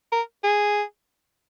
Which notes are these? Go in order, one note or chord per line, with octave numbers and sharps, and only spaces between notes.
A#4
G#4